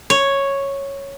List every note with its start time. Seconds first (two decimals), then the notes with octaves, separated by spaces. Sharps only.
0.10 C#5